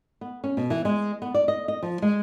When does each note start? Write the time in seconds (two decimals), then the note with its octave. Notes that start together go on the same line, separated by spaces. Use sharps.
0.21 B3
0.44 C#4
0.57 B2
0.70 E3
0.85 G#3
1.22 B3
1.34 D5
1.48 D#5
1.68 D#5
1.83 F3
2.02 G#3